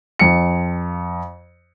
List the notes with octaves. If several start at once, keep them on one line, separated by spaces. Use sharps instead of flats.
F2 C#7